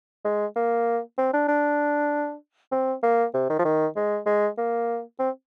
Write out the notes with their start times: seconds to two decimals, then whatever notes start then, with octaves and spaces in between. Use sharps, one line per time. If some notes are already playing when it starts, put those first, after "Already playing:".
0.25 G#3
0.56 A#3
1.18 C4
1.33 D4
1.48 D4
2.72 C4
3.03 A#3
3.34 C3
3.50 D#3
3.59 F3
3.65 D#3
3.96 G#3
4.26 G#3
4.58 A#3
5.19 C4